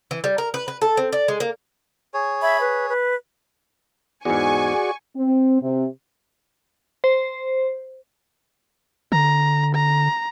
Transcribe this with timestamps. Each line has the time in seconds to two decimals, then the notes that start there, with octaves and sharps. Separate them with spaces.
0.11 E3
0.24 G3
0.38 A#4
0.54 B4
0.68 B4
0.82 A4
0.97 C4
1.13 D5
1.28 G#3
1.40 A#3
2.14 G#4 C#5
2.42 E5 B5 G#6
2.60 B4
2.88 B4
4.25 E2 G#2 F#4 G#4 D5 G#5 C#6
5.17 C4
5.63 C3
7.04 C5
9.12 D3 A#5
9.74 A#5